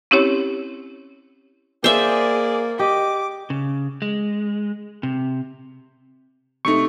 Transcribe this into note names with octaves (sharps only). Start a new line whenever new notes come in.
C4 C#4 E4 G4 C#5
A#3 G#4 C5 D5 E5
G4 D#5 D6
C#3
G#3
C3
C3 A3 D#4 C#6